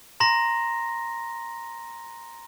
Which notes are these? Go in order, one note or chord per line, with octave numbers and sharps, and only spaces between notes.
A#5 C6 A#6